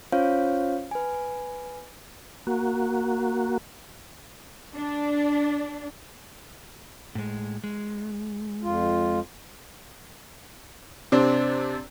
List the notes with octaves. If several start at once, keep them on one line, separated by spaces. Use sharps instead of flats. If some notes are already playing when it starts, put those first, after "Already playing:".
C#4 F4 C5 C#5 F5
B4 G#5
A#3 F#4
D4
A2 G#3
G#3
F2 F4
C3 C4 D4